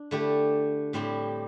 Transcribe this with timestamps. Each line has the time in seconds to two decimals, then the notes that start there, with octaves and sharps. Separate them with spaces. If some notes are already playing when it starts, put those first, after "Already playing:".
Already playing: D4
0.11 D3 A3 E4 G4
0.93 A2 G3 C4 E4 G4